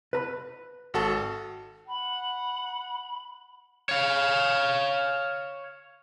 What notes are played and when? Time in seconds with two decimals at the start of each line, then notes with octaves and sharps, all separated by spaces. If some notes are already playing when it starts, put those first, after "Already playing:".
0.13 B4 A#5 B5
0.94 G#1 F#4 A4
1.88 F#5 B5
3.89 C#5 F5